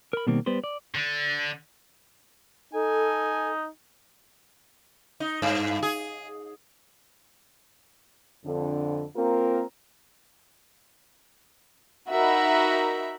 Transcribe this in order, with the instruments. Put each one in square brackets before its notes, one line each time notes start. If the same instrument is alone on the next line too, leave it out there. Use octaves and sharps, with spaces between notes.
[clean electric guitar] A#4 B5
B2 D#3 G3 A#3 C4
G3 B3 B4 C5
D5
[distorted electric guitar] D3
[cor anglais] D#4 [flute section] A4 [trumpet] G#5
[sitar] D#4
G2
G#4
[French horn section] F2 D3
A#3 C4 F4 A#4
[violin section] D#4 F#4 A#4 E5 B5